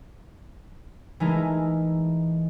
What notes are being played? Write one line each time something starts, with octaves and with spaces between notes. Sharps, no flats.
E3 G#3 A3 D#4 E4 A#4